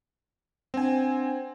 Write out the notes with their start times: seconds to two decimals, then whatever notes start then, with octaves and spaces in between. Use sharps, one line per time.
0.74 C4 D4 C5 F#5 G#5